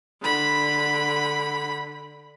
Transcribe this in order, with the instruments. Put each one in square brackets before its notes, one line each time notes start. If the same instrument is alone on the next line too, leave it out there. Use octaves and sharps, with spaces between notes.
[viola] D3 B5